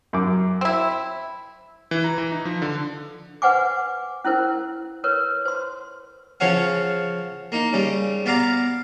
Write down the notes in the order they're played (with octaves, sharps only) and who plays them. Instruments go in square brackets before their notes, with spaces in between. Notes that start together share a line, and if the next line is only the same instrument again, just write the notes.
[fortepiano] F#2 D6
[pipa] C4 E4
[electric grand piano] E3
A#5
E3
D#4
F3
D3
[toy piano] B4 C5 F#5 G#5 D6
C#4 E4 A#4 C5
A#4 B4 C#5
C5 C6
[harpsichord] C#3 F3 C#5 F5 F#5
A#3 D#4
C#3 G3
B3 D5 F5 A#5 D6